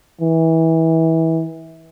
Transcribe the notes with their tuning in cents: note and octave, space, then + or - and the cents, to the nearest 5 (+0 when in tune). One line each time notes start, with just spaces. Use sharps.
E3 -25